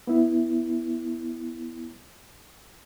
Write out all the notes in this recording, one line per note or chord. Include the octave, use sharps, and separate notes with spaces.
B3 E4